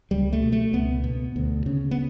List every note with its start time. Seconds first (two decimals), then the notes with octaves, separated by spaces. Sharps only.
0.11 C#2 G3
0.33 A3
0.42 B2
0.52 A3
0.73 C#2 B3
1.04 B2
1.36 D2
1.66 C#3
1.91 B3